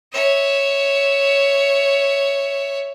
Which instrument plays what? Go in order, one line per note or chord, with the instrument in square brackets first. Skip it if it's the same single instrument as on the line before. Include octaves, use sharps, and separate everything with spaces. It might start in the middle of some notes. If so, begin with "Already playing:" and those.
[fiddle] C#5 E5